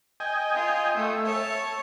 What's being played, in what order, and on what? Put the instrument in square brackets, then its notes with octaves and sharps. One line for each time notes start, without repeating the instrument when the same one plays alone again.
[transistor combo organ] D#5 G5 G#5
[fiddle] F4
[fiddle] A3 [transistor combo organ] E5
[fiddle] C#5 A5